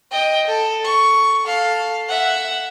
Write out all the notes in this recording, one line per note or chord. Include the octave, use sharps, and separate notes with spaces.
D#5 G5
A4
C#6
A4 F5
E5 F#5